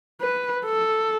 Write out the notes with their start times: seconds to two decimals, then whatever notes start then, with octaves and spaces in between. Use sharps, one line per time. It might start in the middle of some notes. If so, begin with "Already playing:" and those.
0.21 B4
0.65 A4